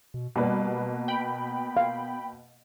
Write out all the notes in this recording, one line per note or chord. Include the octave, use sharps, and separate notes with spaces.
B2
B2 G3 A#3 B3 B4
G5 B5
F5